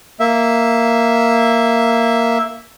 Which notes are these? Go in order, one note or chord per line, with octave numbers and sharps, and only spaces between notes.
A#3 E5